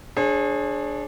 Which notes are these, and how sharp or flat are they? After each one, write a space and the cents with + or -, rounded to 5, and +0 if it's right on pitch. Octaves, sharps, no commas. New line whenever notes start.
D4 +0 G#4 +15 C#5 -45